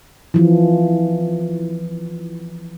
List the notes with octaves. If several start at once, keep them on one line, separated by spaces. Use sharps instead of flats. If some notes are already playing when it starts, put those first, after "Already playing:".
E3 F3